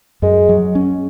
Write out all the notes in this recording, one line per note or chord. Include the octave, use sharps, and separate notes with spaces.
F#2 G#3
F#3
C#4